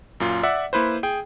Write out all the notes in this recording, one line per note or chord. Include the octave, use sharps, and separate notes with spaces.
F#2 A#2 F4
D5 E5 F#5
A#3 E4 B4 C5
G#4 G5